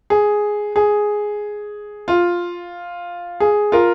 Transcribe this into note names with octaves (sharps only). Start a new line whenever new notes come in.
G#4
G#4
F4
G#4
F4 A#4